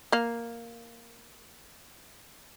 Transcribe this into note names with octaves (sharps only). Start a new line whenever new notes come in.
A#3 F5